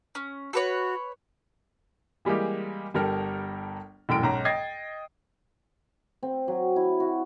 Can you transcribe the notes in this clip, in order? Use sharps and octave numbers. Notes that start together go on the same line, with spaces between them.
C#4
F#4 A4 B4 C#5
E3 G3 G#3 A#3 G4
G1 G3 A4 A#4 G5 F6
E1 F#2 A2 G5 D7
B1 G#2 C#4 A#5
D#5 G5 G#6 A6 C7
C4
F#3
E4
F#4